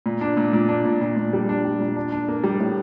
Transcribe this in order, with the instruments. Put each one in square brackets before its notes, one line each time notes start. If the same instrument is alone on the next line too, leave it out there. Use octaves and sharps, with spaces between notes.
[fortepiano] A#2
D4
A#2
A#2
D4
A#2
A#2
A#2
G3
D4
G3
A#2
D4
D4
A#3
G3
A2